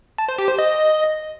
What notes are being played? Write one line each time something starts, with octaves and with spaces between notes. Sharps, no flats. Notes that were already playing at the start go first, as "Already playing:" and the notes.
A5
C5
G4
C5
D#5